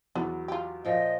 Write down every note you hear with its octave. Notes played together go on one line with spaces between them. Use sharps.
E2 F#3 B3
F4 G4
A#2 F3 D#5 G5